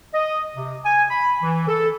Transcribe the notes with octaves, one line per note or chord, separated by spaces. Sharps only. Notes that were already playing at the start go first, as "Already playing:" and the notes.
D#5
C3
G#5
B5
E3
A4